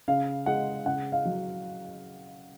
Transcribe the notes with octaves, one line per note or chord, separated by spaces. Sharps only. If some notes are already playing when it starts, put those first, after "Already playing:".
C#3 F5
G#3 F#5
C#3 F#5
F5
F#3